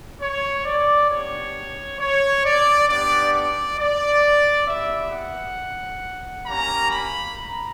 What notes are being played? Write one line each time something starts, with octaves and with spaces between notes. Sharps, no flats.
C#5
D5
B3 D4 G4 C#5
C#5
D5
B3 D4 G4 D5
D5
D5
B3 E4 G4 E5
F#5
A#3 C#4 G4 A#5
B5
A#5